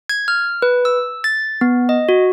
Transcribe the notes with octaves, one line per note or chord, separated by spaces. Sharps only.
G#6
F6
B4
E6
A6
B3
D#5
F#4